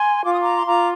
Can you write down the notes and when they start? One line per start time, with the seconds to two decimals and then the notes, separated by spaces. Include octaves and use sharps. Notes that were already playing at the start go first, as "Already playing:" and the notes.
Already playing: G#5 C6
0.25 F4 D6
0.33 D#6
0.41 A#5 D6
0.56 C6
0.67 F4 A#5 D6